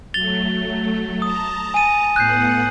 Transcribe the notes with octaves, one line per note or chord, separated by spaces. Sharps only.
F#3 A3 A6 F7 G7
A5 A#5 D#6
G#5 D#7
A2 B3 F#5 F#6 G6 C7